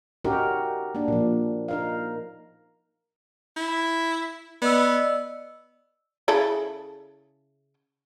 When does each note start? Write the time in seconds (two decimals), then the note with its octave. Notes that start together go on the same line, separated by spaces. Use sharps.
0.24 C#4 D#4 F#4 G4 A#4
0.95 A#3 D4
1.08 A#2 F3
1.68 D#4 A#4 F5
3.57 E4
4.62 B3 D5 D#5 E6
6.28 C#3 E4 A4